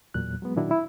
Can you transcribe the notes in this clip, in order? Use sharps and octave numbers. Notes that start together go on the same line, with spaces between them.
E2 A#2 F#3 F#6
F#3 G#3 B3
A#2 D#3 F#3 D4 E4 F#4
E4